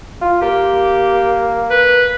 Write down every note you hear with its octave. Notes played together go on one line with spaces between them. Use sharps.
F4
A#3 G4
B4